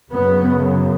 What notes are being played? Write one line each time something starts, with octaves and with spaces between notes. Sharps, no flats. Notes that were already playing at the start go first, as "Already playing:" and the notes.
F#2 C#3 B3